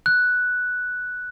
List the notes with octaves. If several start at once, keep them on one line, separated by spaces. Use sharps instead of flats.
F#6